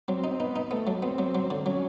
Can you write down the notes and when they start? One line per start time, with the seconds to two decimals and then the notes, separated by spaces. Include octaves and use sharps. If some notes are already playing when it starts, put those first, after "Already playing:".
0.08 F#3 C4
0.24 D#4
0.31 C4
0.40 B3 D#4
0.56 D#4
0.71 A3 B3
0.87 F#3
1.03 B3 C4
1.19 F#3
1.35 F#3
1.50 D3
1.66 F#3 C#4